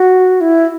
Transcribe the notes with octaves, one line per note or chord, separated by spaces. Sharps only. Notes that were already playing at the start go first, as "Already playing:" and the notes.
Already playing: F#4
E4